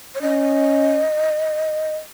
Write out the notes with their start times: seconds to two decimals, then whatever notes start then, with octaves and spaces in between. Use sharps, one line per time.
0.15 C#5
0.22 C#4 D#5